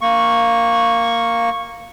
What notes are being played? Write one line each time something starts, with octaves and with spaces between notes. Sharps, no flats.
A#3 C#6